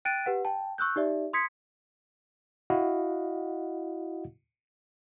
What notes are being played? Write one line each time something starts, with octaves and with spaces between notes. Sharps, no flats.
G5 F#6 A6 D7 D#7
G4 B4 F#5
G5 A5
C#6 E6 F#6 G6
D#4 G4 D5 E5
C6 D#6 G#6 B6 C#7
E4 F#4 D#5 F5 F#5